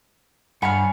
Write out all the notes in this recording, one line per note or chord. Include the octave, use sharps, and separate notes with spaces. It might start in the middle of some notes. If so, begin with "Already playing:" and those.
G2 G#4 C#5 F5 F#5 B5